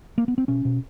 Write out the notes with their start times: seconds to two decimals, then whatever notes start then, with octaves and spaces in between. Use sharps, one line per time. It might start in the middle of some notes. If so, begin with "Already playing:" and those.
0.18 A#3
0.28 B3
0.38 C4
0.48 B2 C#4
0.65 B2